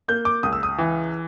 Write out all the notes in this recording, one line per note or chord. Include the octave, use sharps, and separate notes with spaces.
A#3 G6
D6
C#2 D#6
E6
D#6
E3